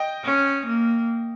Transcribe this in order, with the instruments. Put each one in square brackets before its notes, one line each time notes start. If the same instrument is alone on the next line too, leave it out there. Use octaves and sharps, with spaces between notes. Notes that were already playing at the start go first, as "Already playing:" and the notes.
Already playing: [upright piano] D#5 G5
[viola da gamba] C#4
A#3